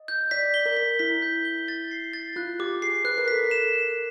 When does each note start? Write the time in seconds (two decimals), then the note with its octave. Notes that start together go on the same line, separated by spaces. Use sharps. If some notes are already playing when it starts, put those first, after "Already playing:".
Already playing: D#5
0.08 G6
0.31 D5 B6
0.54 G7
0.66 A#4
0.77 B6
0.99 E4 B6
1.22 G6
1.45 G7
1.68 A6
1.91 C7
2.13 A6
2.36 F4 F#6
2.60 G4 D6
2.82 G#4 C7
3.05 B4 F#6
3.18 A#4
3.28 A4 B6
3.44 A#4
3.51 E7
3.73 B6